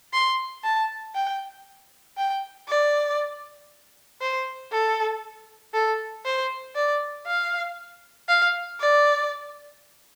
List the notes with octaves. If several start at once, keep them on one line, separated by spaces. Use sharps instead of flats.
C6
A5
G5
G5
D5
C5
A4
A4
C5
D5
F5
F5
D5